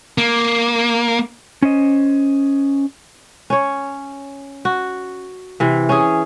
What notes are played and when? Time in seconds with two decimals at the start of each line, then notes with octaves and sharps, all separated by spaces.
0.18 A#3
1.62 C#4 C5 D#5
3.50 C#4 C#5
4.65 F#4
5.60 C3 E3
5.89 C#4 G#4